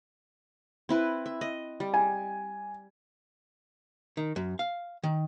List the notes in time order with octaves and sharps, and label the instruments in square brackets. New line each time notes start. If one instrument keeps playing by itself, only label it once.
[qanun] C4 E4 B4
E5
D#5
G3
[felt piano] G#5
[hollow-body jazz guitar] D#3
F#2
F5
D#3